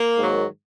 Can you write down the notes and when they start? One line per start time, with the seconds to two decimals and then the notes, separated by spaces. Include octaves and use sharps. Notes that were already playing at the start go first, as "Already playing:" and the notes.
Already playing: A#3
0.18 G#2 D#3 F#3